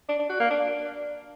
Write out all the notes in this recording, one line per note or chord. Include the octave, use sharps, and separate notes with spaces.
D4
D4
F#4
A#3
D4